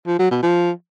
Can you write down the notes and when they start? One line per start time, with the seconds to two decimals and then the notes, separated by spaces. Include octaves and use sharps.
0.07 F3
0.19 F#3
0.31 B2
0.43 F3